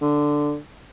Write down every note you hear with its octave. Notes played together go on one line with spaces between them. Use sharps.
D3